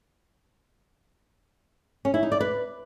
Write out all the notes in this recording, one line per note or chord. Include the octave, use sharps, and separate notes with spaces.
C#4
E4
D#4
D5
B4